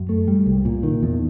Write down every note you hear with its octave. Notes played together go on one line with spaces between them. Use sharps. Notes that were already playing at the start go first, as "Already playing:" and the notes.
Already playing: F#2
A3
G3
C2
A#2
D#3
E2